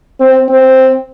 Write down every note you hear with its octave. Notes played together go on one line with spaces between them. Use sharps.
C4
C4